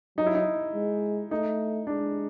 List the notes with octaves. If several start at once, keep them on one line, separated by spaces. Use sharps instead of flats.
F#3 D#4
E4
D#4
G#3
A3 D#4
G#3 D4